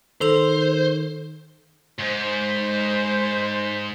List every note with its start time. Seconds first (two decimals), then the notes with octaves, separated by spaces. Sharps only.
0.21 D#3 A4 C5 F7
1.99 G#2 C5